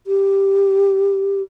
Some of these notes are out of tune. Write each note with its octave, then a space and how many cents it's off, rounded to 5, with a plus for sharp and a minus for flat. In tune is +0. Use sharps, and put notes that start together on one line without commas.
G4 +5